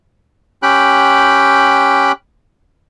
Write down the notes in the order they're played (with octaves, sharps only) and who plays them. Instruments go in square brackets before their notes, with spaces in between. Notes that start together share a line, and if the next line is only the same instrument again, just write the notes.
[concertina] C#4 G4 G5 B5 F#6